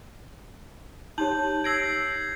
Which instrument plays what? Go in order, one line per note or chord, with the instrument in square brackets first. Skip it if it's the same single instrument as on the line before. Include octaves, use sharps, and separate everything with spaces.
[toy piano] D#4 G4 C#5 [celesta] A5 [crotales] G6 F#7
[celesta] E6 A#6 D7 [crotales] G#6 C7 F#7